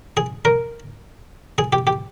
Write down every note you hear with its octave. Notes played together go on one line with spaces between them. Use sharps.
G#4
A#4
G#4
G4
G4